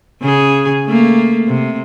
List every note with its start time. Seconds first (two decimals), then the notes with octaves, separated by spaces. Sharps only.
0.22 C#3 G#4
0.87 A3 A#3
1.47 C3